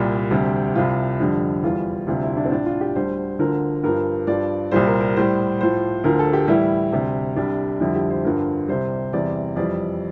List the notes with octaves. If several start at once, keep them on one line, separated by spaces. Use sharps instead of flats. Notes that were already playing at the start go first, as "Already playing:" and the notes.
Already playing: C2 A#2 G3 G4
D2 C3 G3
C2 C3 F3 F4
F2 D3 G3
E2 E3 G3 F4
D2 C3 G3 F4
E4
D4
C4
A2 F3 D4
F4
G4
D2 D3 G3 C5
D2 D3 F3 A#4
G2 F3 A#4
G2 F3 D5
C2 A#2 G3 C5
A#4
A#4
A2 G3 C5
A2 F3 C5
D2 D3 F3 A#4
A4
G4
A2 E3 G3 E4
D2 C3 G3
C2 C3 G3 D4
F2 D3 G3 E4
G4
C5
G2 D3 F3 A#4
C2 C3 G3 C5
E2 C3 E3 G3 D5
F2 E3 G3 D5